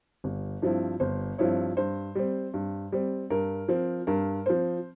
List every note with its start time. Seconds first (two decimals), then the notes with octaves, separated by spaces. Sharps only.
0.24 G1
0.62 G2 F3 C4 E4
1.00 G1 C5
1.38 G2 F3 C4 E4 C#5
1.77 G2 C5
2.15 G3 C4
2.54 G2
2.92 G3 C4
3.30 G2 A#4
3.68 F3 C4
4.07 G2 A#4
4.46 F3 C4 C5